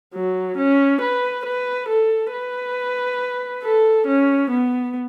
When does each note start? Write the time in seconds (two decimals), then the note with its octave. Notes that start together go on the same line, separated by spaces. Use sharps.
0.14 F#3
0.58 C#4
1.01 B4
1.45 B4
1.89 A4
2.33 B4
3.63 A4
4.07 C#4
4.51 B3